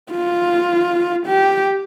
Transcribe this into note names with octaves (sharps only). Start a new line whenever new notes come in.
F4
G4